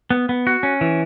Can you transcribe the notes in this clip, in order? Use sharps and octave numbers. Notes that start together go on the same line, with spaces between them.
B3
B3
F#4
C#4
E3